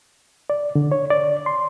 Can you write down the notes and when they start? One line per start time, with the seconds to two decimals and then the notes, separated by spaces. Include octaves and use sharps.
0.50 D5
0.75 D3
0.92 C#5
1.10 D5
1.46 C6